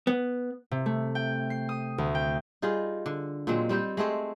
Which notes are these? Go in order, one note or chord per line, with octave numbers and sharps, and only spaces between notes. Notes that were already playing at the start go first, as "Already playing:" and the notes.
B3
C3
A3
G5
C7
D#6
D2
G5
G3 D#4 F4 G#4
D3
A#2 F#3 G#3 C4
G3 C4 D#4 G4
G#3 A3 C4 G#4